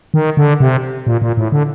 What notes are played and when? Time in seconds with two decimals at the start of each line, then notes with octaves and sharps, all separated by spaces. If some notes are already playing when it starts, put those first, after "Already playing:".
0.14 D#3
0.37 D3
0.60 C3
1.07 A#2
1.22 A#2
1.37 A2
1.52 D3